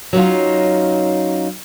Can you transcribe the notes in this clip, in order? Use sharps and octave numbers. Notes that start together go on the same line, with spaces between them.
F#3 C#4 D#4 F4